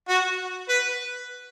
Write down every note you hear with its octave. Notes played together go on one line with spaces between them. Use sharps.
F#4
B4